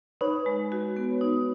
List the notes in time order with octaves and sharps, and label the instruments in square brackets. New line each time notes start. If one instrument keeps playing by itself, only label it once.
[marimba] D#4 [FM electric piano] B4 C#5
[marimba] G#3
F#4
B3
D#4